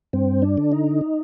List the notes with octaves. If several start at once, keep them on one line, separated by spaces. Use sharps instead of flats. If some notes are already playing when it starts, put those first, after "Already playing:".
G2 C4
D4
D3
D#4